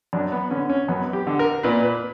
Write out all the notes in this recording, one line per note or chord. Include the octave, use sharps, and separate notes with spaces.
F#2 D4
B3
D3 C#4
C#4
F#2 B3
G4
D3
A#4
A#2 B4
B4